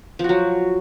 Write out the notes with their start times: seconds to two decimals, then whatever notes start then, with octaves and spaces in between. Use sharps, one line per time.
0.19 F3
0.24 F#4
0.29 F#3